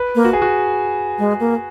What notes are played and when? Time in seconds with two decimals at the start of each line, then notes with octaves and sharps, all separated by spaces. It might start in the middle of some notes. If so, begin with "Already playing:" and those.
Already playing: B4
0.15 A#3
0.25 F#4
0.33 G#4
0.42 F#4
1.19 G#3
1.40 A#3